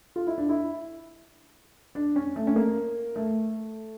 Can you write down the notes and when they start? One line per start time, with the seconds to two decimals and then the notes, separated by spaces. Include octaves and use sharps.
0.16 F4
0.27 E4
0.38 D4
0.49 E4
1.95 D4
2.16 C#4
2.36 A3
2.47 C#4
2.56 A#3
3.16 A3